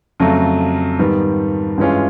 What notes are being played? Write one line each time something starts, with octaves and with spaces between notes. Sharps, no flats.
F2 C#3 F#3 A3
G#2 D#3 G3 B3
G2 E3 G#3 C#4 F4